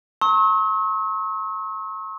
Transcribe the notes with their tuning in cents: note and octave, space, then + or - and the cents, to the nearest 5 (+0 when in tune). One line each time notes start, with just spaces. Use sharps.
A#5 -35 C#6 -40 E6 -45